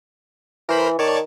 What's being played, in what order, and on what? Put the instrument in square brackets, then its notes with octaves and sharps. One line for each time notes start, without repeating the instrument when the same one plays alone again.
[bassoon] E3 [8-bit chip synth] A#4 C5 B5
[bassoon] D#3 [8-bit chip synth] C#5 D5 A5